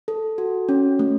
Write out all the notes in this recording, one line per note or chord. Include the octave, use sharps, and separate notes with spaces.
A4
F#4
C#4
A3